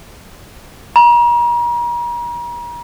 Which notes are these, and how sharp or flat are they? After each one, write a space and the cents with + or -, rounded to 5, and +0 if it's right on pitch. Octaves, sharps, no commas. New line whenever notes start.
A#5 +40